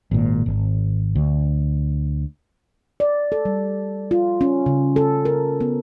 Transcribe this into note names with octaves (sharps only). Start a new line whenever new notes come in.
G#1 A#2
G#1
D2
D5
A4
G3
F4
C#4
C#3
A4
A#4
B3